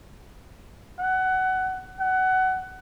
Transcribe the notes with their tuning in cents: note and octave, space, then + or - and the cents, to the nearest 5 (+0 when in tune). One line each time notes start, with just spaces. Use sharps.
F#5 +20
F#5 +20